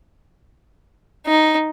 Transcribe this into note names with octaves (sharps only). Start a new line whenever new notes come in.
D#4